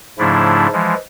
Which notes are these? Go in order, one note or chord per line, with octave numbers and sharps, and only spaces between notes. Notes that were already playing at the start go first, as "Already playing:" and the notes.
G#2 C#3 F3 A3 D4 E4
E3 F3 G#3